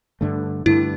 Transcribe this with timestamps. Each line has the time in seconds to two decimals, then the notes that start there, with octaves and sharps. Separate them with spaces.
0.21 G2 D3 A3
0.66 G2 D3 A3 E4